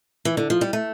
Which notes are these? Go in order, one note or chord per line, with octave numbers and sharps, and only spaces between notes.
E3
D3
F3
G3
A3